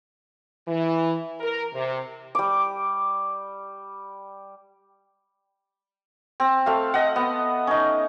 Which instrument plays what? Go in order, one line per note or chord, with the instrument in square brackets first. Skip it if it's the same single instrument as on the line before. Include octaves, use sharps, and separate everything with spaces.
[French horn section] E3
A#4
C3
[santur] G3 D6
C4
A3 F5
D#5 F#5
B3
C#4 D#4